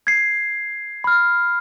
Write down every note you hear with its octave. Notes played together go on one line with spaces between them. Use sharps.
G#6 C7
B5 F6